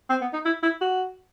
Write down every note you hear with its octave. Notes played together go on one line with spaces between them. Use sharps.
C4
B3
D#4
E4
E4
F#4